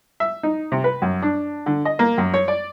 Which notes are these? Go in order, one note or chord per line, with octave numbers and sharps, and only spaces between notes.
E5
D#4
C3
B4
F#2
D4
D3
D#5
A#3
F#2
C#5
D5